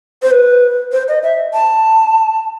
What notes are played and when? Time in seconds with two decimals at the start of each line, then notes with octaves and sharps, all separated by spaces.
0.22 C5
0.31 B4
0.92 C5
1.08 D#5
1.23 E5
1.54 A5